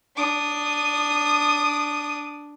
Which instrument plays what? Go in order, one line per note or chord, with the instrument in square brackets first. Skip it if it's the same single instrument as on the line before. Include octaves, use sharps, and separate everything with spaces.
[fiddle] D4 D#6